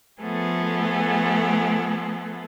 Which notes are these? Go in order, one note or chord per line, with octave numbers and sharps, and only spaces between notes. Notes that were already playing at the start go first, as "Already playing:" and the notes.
F3 A3 B3 G#4 A4